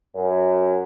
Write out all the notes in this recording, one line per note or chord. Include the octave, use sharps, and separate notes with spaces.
F#2